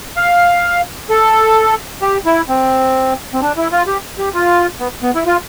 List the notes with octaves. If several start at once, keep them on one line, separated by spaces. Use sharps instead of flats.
F5
A4
G4
E4
C4
C4
D4
E4
F4
G4
G4
F4
B3
B3
E4
F4